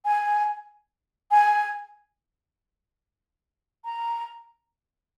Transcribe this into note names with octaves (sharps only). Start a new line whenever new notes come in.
G#5
G#5
A#5